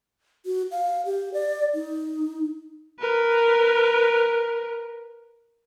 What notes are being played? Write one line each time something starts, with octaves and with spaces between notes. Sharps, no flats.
F#4
F5
G4
D5
D#4
A#4 B4